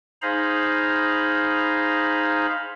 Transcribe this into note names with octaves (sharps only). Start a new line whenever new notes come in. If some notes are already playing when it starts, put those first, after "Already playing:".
D#4 G#4 C5 F5 A#5 B5